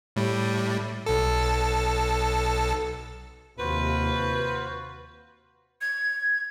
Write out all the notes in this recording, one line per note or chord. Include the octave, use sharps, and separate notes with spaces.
A2 G3
B1 A4
D#2 C3 F4 F#4 B4 C5
G#6